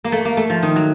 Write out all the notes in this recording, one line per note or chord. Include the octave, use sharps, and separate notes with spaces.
A#3
A3
A#3
A3
F3
D#3
F#3